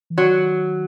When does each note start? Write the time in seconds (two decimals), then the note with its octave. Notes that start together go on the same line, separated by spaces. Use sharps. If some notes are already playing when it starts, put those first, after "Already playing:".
0.10 E3
0.17 D#3 F#3